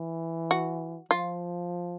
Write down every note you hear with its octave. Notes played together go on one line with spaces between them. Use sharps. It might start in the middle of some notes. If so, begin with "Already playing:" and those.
Already playing: E3
F#4
F3 F4